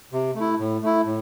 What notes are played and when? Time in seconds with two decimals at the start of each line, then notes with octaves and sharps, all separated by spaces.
0.13 C3
0.35 A3
0.40 E4
0.59 A2
0.83 A3 E4
1.06 A2